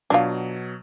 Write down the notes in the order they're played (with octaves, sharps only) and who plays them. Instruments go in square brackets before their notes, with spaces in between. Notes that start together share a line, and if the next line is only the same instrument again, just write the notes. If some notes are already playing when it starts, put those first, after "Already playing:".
[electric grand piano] B2 F#3 [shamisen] D4 F4